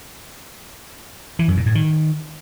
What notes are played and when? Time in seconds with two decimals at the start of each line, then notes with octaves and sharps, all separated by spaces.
1.39 E3
1.48 F#2
1.57 A#2
1.66 A2
1.75 D#3